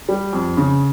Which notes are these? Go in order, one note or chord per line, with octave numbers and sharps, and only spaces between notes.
G3
F2
C#3